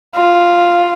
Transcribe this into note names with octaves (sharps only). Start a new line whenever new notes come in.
F4